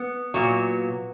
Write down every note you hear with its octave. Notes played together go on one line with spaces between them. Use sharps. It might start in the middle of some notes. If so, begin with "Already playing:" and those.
Already playing: B3
A#2 F#3